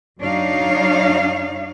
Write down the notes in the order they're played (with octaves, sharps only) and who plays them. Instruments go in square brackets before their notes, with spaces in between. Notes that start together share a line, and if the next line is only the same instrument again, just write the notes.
[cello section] F#2 F#3 D4 D#4 C#5 F5